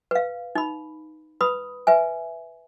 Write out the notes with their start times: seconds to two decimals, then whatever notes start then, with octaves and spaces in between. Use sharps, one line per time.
0.11 B4 F5
0.55 D#4 B5
1.41 B4 B5 D#6
1.87 B4 E5 G#5